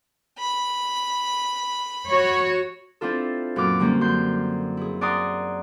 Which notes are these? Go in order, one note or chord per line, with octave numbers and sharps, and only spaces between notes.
B5
F#4 C#5
C4 D4 E4 F4 A4
F#2 A#2 D4 D6 F6
D3 G3 A#3 C4 C#4
F#2 C6 G6
E4 G#4
D5 F#5 G#5 A#5 C6 D#6